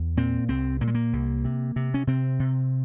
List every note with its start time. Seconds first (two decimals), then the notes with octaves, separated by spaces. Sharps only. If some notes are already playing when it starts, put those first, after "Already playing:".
Already playing: E2
0.17 A#2 C4
0.48 C2 C4
0.81 A#2 A#3
0.87 G#3
0.95 A#3
1.13 C2
1.45 C3
1.76 C3
1.94 C#4
2.07 C3 C4
2.39 C3